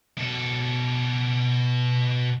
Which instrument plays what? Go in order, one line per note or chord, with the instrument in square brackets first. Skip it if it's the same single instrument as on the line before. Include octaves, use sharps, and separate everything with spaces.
[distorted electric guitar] B2 A4